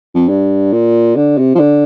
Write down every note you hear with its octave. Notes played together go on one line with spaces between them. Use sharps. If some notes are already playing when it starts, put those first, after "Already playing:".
F2
G2
A#2
D3
C3
F3
D3